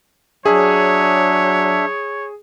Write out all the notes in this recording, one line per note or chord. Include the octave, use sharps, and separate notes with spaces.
F#3 D4 G#4 C#5 E5